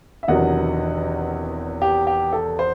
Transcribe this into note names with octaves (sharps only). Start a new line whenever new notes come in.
E5
E1 E2 C3 D#3 F#3 D#5 F#5
G4
G4
A4
C5